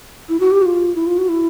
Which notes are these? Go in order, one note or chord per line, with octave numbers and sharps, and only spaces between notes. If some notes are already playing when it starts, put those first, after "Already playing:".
E4
F#4
G4
F#4
F4
E4
F4
F#4
E4